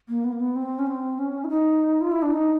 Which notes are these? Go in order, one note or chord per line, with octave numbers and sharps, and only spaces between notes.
A#3
B3
A#3
B3
C4
C#4
C4
C#4
E4
D#4
F4
E4
D4
D#4